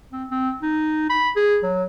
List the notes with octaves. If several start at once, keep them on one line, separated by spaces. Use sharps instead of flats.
C4
C4
D#4
B5
G#4
F#3